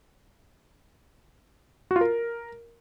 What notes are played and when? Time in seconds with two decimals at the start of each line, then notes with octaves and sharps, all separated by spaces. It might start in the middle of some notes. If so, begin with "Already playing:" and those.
1.91 F#4
1.96 F4
2.01 A#4